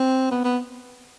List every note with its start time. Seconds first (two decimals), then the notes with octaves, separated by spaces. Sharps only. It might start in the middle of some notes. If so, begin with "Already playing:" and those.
Already playing: C4
0.31 B3
0.44 B3